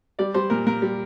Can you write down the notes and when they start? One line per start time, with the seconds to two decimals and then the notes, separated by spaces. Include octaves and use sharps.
0.19 G3 D5
0.34 G3 C5
0.50 A#2 A#4
0.66 A#2 A#4
0.82 G3